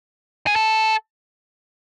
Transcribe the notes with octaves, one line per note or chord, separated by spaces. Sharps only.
G#4
A4